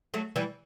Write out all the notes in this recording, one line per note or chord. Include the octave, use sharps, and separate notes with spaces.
F#3 A3
E3 G3